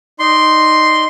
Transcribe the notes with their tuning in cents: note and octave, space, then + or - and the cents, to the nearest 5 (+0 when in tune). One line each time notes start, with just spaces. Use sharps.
D#4 +0 D5 +0 C6 +0